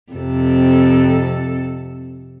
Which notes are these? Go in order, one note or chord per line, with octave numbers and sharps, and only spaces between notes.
F2 C3 A4